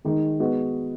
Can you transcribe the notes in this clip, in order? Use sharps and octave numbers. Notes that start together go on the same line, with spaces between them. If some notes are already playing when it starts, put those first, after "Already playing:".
D#3 G#3 D#4
G#3 B3 F#4 D#5